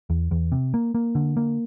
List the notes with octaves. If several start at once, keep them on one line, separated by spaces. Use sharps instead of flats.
E2
E2
C3
A#3
A#3
D3
A#3